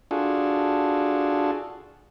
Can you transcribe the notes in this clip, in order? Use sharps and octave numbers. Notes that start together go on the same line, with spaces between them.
D4 F4 F#4 G#4 A4